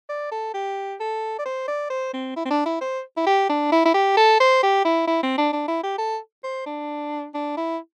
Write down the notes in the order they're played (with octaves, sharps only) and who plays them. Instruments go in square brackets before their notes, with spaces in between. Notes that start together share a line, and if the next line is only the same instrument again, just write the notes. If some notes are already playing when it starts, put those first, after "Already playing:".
[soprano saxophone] D5
A4
G4
A4
D5
C5
D5
C5
C4
E4
C4
D4
E4
C5
E4
G4
D4
E4
E4
G4
A4
C5
G4
E4
E4
C4
D4
D4
E4
G4
A4
C5
D4
D4
E4